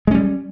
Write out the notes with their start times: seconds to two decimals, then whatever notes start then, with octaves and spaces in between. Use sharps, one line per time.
0.07 G#3
0.11 C#4
0.14 G3